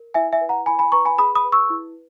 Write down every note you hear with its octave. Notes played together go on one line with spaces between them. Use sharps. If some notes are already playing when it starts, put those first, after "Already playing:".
Already playing: A#4
E4 E5 G#5
E5 G#5
B4
F#5 A#5
E4 G#5 B5
G#5 B5
B4 A#5 C#6
G#5 B5
G#4 B5 D#6
B5 D#6
B4
C#6 E6
E4